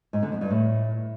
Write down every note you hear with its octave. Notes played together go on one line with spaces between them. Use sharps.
G#2
D3
F2
G2
A2